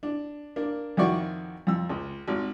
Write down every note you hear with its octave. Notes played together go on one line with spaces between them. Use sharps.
D4
A#3 D4
F2 D#3 E4 F#4 D5 C#6
F2 E6
C#2
G#1